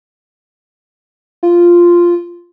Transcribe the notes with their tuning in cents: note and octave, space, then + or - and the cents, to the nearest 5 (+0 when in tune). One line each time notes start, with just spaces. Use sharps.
F4 -5